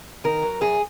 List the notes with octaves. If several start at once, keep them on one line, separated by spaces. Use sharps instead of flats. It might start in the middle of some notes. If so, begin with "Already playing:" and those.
D#3 A#4
F#3
F#2 G#4